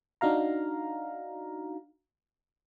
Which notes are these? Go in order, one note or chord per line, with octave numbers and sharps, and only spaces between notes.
D4 D#4 F#4 F5 A#5